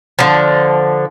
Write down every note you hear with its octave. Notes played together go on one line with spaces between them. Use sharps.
D3 F3